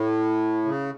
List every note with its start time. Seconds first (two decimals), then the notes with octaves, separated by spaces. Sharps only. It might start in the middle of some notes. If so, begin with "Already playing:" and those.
Already playing: A2
0.65 C#3